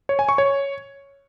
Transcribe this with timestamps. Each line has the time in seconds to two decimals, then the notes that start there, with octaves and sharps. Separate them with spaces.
0.09 C#5
0.19 G#5
0.29 C#6
0.38 C#5